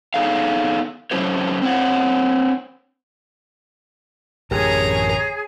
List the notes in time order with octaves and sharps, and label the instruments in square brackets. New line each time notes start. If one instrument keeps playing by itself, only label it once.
[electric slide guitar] B3 D#4 G#4 A4 C#5 F5
F#3 A3 C#4 G4 C5 C#5
C4 C5 C#5 F#5
[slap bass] A1 F#2 D3 [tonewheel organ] G4 A#4 [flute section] G#4 [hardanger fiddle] C#5 A#5